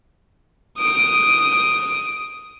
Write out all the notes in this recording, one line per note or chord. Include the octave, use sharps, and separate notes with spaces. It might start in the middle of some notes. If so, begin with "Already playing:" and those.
D#6 D7